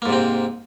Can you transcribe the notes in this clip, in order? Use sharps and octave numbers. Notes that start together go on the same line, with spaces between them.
G#2 C3 A#3 C4